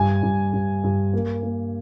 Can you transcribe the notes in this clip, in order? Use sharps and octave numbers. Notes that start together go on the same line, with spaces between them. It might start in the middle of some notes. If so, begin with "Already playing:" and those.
Already playing: G2 G#5
G2
G2
G2
A#3
A#3